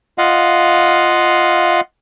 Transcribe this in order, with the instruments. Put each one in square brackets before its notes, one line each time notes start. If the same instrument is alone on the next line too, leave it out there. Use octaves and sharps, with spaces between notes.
[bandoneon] F4 D#5 F5 F#5